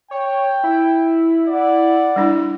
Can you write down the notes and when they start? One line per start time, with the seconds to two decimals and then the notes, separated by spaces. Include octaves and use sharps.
0.11 C#5 G5
0.64 E4
1.48 D5 F#5
2.16 G3 D4 E4